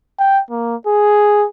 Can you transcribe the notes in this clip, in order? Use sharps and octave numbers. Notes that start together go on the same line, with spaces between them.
G5
A#3
G#4